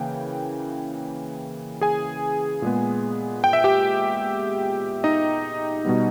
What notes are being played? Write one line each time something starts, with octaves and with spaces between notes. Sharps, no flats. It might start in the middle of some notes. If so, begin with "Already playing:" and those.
Already playing: C#3 E3 A#3 G5
G#4 G#5
A#2 G#3 B3
G5
E5
G4 G5
D#4 D#5
B2 G3 B3